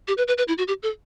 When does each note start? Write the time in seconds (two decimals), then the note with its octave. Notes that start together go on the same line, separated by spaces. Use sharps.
0.08 G4
0.18 B4
0.28 B4
0.38 B4
0.48 E4
0.58 F#4
0.68 G4
0.83 A4